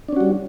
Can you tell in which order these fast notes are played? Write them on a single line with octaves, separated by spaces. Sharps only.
D4 C#4 F#4 G3